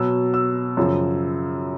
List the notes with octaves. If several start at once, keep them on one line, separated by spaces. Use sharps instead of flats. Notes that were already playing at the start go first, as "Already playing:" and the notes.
Already playing: B2 F#3 E6
E6
F#2 C#3 F3